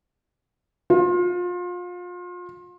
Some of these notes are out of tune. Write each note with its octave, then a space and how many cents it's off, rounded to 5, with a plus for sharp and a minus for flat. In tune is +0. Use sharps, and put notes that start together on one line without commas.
F4 +30